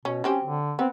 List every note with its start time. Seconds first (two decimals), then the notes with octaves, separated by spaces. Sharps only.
0.05 B2 C#4
0.24 F#3 C4 C#4 G4
0.43 D3
0.79 B3 C4